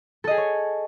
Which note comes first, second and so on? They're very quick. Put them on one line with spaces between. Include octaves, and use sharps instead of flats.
A4 D#5 G#4 G#5 C#5